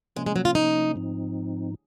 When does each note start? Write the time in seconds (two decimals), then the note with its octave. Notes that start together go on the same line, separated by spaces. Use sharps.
0.16 C3 F3 G#3 A#3 C#4
0.26 G#3
0.36 F#3
0.45 F4
0.55 D#4
0.95 G#2 F3 C4 D#4